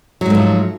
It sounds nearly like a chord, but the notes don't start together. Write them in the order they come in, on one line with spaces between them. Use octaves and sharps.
F#3 G#2 A3 F3